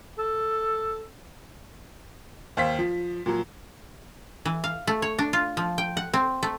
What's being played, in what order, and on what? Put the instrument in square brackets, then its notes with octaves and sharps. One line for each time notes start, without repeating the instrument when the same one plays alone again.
[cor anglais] A4
[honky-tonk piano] D#2 C5 F5 B6
F3
A#2 F3 F#3
[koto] E3
F5
A3
C#5
D4
F4
F3
G5
F#5
C4
A3